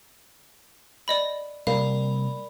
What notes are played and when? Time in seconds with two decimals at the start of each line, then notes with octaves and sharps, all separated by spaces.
1.08 D5 D#5 B5
1.67 C3 G3 A#3 A#4 D5 F5 B5